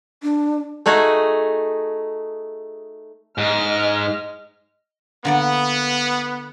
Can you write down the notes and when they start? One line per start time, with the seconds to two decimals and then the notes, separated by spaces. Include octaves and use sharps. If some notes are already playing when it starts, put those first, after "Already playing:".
0.23 D4
0.86 A3 D#4 F#4 G#4
3.38 G#2 D#5 F6
5.25 D3 A#3 B3 D5